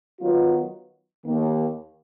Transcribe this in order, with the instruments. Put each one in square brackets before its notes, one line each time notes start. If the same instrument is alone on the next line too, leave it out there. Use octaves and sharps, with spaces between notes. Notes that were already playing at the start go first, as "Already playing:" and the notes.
[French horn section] D#3 F#3 B3 F4
D#2 D#3 A#3